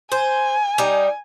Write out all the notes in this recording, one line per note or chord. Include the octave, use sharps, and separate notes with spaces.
C5 G#5
G3 D#4